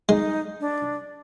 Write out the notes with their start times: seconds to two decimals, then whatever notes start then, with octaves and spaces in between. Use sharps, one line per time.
0.09 G#3 D#4
0.60 D4